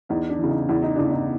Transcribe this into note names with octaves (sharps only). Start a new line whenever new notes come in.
E2 D#4
D4
C#3 E3
D#4
E2 E4
D#4
C#3 E3 D4
D#4